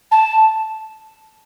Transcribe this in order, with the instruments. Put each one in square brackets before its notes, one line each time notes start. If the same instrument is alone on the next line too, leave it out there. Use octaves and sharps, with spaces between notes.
[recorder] A5